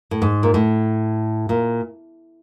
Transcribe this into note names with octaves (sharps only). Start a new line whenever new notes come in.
A2
G#2
A#2
A2
A#2